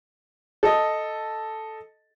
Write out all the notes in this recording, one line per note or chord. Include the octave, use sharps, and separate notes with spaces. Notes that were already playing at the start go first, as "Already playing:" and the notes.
A4 D#5